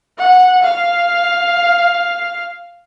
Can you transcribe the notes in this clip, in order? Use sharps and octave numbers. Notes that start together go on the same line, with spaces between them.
F#5
F5